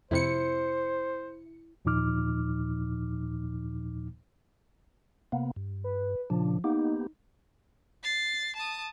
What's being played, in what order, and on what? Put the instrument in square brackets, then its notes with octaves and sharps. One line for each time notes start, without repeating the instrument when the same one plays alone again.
[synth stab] F2 C3 C#7 [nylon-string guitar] E4 [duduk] C5
[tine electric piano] D#2 A#2 F3 D#4 D6 F6
[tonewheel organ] C3 A#3 B3
G2
[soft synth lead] B4
[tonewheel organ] A#2 C#3 D4 [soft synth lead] F3
[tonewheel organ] A#3 B3 G4 [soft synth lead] D#4
[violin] A6 C7
A5 D#6